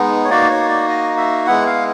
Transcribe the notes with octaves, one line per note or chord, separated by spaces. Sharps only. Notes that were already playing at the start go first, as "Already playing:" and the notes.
Already playing: G#3 B3 D#4
C#5
A#3 D#4 F#4 D5
C#5
D5
D#5
E5
G#3 B3 E4 F#5
F5